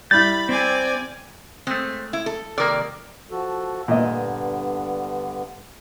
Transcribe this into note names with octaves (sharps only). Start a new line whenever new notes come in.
G3 E4 B5 G6 A6
C4 D5 G5 G#5
G#3 A3 C4
E4
A4
C3 D#3 A#3 A#4 D5
F3 F#4 A4
G2 A#2 D3 B3 D#5